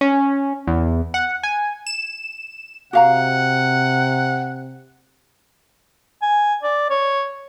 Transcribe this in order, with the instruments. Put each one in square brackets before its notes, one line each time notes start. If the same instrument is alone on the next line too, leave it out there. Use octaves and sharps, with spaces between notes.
[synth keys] C#4
E2
F#5
G#5
E7
[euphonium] C3 [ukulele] F#4 F5 A#5 [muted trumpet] F#5
[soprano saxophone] G#5
D5
C#5